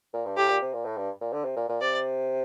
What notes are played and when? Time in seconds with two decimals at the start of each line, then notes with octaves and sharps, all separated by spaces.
0.14 A#2
0.26 G2
0.37 A2 G4
0.49 A#2
0.62 C3
0.73 A#2
0.85 A2
0.97 G2
1.21 A#2
1.33 D3
1.45 C3
1.56 A#2
1.69 A#2
1.81 C3 D5